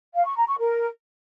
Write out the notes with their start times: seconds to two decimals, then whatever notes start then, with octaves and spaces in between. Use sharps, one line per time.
0.15 F5
0.26 C#6
0.37 A#5
0.48 C#6
0.59 A#4